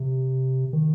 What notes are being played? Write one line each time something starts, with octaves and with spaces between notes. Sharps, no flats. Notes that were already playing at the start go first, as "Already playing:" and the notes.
Already playing: C3
D#3